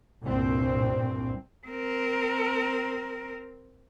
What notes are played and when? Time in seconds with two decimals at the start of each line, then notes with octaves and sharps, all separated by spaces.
0.23 C2 G2 A#2 C4
1.67 C4 A#4